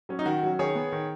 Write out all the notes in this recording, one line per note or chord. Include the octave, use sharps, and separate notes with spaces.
F#3 C#4
D#4
D#3 F#4
F#3 C#4
D#3 G#4 C#5
B3
D#3